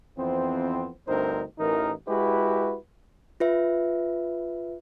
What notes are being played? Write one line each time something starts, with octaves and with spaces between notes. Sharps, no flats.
F2 E3 B3 C4
D2 G2 C4 D#4 A#4 C5
A1 E3 D#4 A#4
G#3 E4 F#4 G4 B4
F4 B4 E5